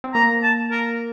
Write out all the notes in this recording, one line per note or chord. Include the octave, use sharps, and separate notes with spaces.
C4
A#3 A#5
A5
A#4